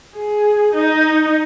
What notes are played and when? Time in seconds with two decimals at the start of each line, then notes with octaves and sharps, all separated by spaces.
0.15 G#4
0.74 D#4